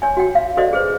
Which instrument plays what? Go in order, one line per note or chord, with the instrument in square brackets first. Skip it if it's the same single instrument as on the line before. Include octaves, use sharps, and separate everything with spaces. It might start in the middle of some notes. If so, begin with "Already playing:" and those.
[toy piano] C#5 G#5
F#4 G5
F5
F#4 A4 C5 D5 D#5
G#4 B4 C5